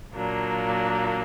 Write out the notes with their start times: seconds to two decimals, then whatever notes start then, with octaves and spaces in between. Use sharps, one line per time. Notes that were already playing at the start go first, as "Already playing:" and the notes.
0.13 A#2 F#3 A#3 D4